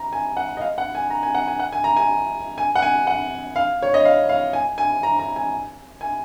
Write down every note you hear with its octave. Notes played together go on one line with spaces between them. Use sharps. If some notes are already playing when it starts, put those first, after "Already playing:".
Already playing: A#5
G#5
F#5
D#5
F5
F#5
G#5
A#5
G#5
F#5
G#5
F#5
G#5
A#5
G#5
G#5
F#5
G#5
F#5
F5
C#5
D#5
F5
F5
G#5
G#5
A#5
A#5
G#5
G#5